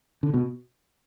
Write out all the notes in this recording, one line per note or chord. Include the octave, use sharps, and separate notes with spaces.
D3
B2